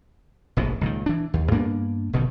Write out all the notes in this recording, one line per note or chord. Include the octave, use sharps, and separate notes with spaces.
F1 A#1 G#2 B2
C#2 A#2 D#3
E3 D4
D#2
G2 A#3 B3 D4
F1 B2 D3 D#3